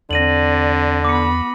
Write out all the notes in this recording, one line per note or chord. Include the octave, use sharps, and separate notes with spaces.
E2 D3 C4 D5 A#6 D#7 F#7
B3 B5 D6 C#7